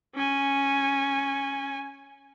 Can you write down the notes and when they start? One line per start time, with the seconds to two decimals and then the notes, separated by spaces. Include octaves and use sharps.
0.15 C#4 G#5